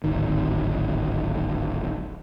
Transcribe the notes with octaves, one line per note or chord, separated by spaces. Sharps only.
D1 G#1 D#3